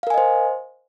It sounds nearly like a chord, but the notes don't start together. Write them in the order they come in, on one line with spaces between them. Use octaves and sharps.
F5 A#4 G#5 D#5 C5